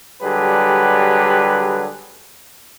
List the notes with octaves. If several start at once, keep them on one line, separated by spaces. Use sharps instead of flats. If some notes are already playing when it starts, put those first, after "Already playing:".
D3 F#3 G3 G4 G#4 B4